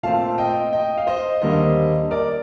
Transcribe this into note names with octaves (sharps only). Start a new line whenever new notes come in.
A#2 A3 C4 F5 A5
D#5 G5
D#5 G5
F5
C5 D#5
D#2 D3 G3 A#3 C5 D#5
A#4 D5